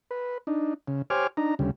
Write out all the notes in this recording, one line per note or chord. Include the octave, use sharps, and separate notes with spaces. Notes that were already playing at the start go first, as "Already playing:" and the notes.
B4
D4 D#4
C#3
G4 C5 C#5 G#5 D6 F6
D4 D#4 A#5
D2 C#3 G3